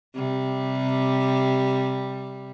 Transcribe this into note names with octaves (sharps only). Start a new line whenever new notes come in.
C3 G3